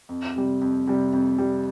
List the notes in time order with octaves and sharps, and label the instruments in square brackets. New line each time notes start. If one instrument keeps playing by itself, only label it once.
[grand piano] F2
C3 G3
F2
C3 G3
F2
C3 G3